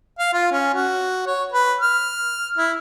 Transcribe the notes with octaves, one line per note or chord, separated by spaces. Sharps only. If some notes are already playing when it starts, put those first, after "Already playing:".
F5
F4
C#4
F#4
C#5
B4
F6
E4